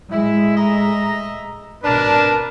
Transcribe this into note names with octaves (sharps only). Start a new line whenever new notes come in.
A2 G#3 E4
D#5 E5 A#5
G#1 B2 D4 A#4 B4 A5